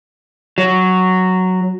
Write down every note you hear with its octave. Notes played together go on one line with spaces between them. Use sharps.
F#3